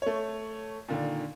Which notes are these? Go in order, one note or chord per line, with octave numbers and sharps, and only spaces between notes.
A3 C#5
A#2 D3 D#3